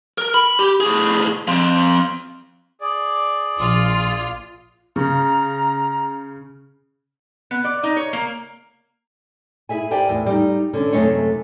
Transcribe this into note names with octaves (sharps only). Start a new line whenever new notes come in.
A#4
B5
G4
A2 G#4
F3 C4
G#4 D5
A#1 F4
C#3 A#5
B3
D5
D#4
C#5
A#3
E4 G#4 E5 G#5
G4 A#4 C5 D5 G5 G#5
E2 A2
G3 D#4
D3 C#4
F#2 C3 G#3 A3 D#4 C#5